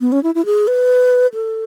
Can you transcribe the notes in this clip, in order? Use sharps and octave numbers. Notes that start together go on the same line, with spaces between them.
B3
C#4
E4
E4
G#4
B4
A4